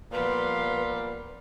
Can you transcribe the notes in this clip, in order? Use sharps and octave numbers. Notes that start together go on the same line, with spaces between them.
A#2 F3 G3 B3 B4 F5 C6